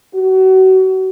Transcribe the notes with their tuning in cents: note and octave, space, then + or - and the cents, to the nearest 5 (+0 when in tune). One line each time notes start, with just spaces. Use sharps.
F#4 +30